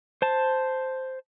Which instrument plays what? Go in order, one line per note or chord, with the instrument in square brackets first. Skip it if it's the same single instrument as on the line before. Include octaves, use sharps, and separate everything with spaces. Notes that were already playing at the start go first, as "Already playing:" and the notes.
[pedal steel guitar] C5 A5